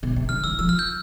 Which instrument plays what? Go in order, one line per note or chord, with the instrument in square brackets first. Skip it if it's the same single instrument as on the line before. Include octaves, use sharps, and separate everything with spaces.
[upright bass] B2
C3
[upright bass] D3 [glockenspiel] F6
[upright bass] E3 [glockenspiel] E6
[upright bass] F3 [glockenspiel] E6
[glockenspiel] F6
G6